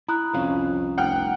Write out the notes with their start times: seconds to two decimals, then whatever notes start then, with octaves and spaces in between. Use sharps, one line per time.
0.08 E4 A#5 D#6 F#6
0.34 C2 F2 C#4 F5
0.98 F1 F#5 G5 F6